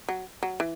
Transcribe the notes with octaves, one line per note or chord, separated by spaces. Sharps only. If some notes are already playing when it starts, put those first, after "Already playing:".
F#3
F#3
E3